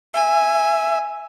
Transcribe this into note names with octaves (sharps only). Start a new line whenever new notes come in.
E5 G#5